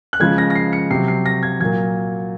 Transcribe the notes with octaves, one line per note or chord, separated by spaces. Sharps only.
F#6
C#3 F3 G#3 G#6
A#6
A#6
C7
C#7
C3 F#3 C7
C7
A#6
G#6
A#2 F#3 G#6